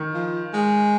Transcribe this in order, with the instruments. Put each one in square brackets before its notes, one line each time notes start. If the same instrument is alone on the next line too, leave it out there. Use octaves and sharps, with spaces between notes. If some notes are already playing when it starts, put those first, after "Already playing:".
Already playing: [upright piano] D#3
[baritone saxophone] F3
G#3